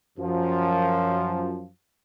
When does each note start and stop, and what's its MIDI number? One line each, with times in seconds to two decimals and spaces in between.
0.18 1.67 42
0.18 1.67 53